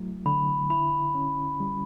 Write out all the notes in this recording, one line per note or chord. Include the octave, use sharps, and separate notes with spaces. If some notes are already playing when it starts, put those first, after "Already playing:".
Already playing: F#3 A3 E4
D3 B5
E4 B5
C#4
G3